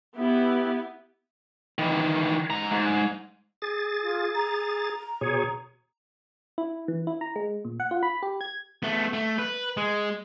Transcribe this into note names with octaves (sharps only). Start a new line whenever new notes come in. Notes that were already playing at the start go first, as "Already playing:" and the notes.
B3 E4 G4
D#3 E3
G#2 A#5
G#2
G#4 A6
F4
A#5
B2 G#4 C#5
E4
E3
E4
A#5
G#3
A#2
F#5
F4
B5
G4
G#6
A3 B3
A3
B4
G#3